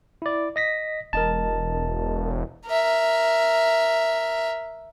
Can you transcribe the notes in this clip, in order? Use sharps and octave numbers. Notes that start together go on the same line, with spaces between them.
E4 D5
D#5 A#6 B6
E1 A#4 D#5 A5
A#4 E5